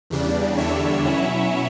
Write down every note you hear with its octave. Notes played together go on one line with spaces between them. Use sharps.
E2 C#3 G3 D4
E2 D3 G3 D4 C#5 E5
B2 F#3 C#4 E4